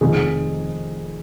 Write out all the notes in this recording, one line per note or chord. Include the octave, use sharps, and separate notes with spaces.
F1 F2 D#3 G#4